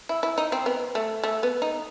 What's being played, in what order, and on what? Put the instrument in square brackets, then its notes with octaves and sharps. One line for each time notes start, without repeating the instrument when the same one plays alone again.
[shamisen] E4
E4
D#4
C4
B3
A3
A3
B3
D#4